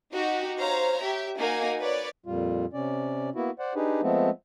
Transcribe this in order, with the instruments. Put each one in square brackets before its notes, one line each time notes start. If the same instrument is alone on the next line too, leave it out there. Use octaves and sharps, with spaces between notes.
[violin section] D#4 F#4 G4
C5 C#5 F5 A#5
G4 E5
A#3 D#4 F#4 G#5
B4 C#5 D5
[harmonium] F2 A#2 G3 F4
C3 C#4 D5
A#3 B3 E4 F#4
C5 D5 F#5
D4 D#4 G4 G#4 B4
F3 G#3 A3 B3 C4